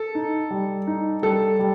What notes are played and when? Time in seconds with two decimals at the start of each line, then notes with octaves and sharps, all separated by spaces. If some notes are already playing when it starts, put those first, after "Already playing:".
Already playing: A4
0.15 D#4
0.51 G3
0.87 D#4
1.22 G3 A4
1.59 G3